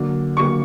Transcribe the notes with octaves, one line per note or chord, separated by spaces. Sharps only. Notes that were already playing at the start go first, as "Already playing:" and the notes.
Already playing: D3 F#3 A#3
D3 F#3 A#3 C#6